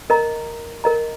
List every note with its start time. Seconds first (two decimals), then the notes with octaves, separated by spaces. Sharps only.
0.10 A#4 D#5 A#5
0.84 A#4 D#5 A#5